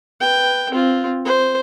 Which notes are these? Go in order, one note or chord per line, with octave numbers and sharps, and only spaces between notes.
B4 G5
C4 F4
C5